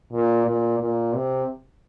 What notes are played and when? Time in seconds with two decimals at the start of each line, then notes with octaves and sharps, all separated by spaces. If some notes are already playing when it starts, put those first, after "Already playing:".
0.13 A#2
0.46 A#2
0.80 A#2
1.13 C3